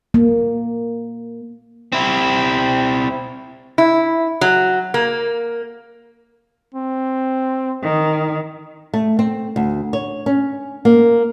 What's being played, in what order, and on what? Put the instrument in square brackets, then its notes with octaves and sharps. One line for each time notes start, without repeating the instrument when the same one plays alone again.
[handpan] A#3
[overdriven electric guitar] C4 E4
[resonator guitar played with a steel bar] E4
F#3
A#3
[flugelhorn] C4
[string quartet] D#3
[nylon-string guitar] A3
C4
D2
C#5
C#4
A#3